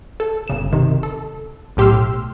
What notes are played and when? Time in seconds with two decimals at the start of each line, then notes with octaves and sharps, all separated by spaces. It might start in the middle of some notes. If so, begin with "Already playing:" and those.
0.20 A4
0.48 G1 C#3 E7
0.73 C3 D#3
1.03 A4
1.77 B1 A2 G4 C6 E6 F6